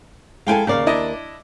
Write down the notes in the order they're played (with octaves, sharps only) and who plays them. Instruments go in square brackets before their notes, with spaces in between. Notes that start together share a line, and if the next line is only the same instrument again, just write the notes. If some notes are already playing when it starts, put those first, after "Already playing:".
[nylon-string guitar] G#3 E4 A4 [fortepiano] F5 G5 G#5
[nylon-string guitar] D#2 A#4 D5 [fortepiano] C#3 F5
[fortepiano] D4 E4 D#5